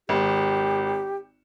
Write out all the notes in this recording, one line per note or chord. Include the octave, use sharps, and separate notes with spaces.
G#1 G4